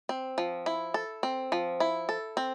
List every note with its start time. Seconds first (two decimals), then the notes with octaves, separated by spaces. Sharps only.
0.09 C4
0.38 F3
0.66 E4
0.94 A4
1.23 C4
1.52 F3
1.80 E4
2.09 A4
2.37 C4